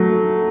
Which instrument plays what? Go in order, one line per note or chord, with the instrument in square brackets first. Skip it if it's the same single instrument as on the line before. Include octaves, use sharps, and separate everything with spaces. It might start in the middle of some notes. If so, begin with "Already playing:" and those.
Already playing: [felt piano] F#3 A3